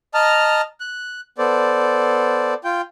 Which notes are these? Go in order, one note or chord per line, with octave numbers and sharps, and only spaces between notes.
D#5 A5 A#5 F6
F#6
B3 A4 C5 D5
F4 G5